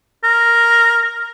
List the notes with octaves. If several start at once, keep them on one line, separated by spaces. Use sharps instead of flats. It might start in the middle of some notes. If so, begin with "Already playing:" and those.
A#4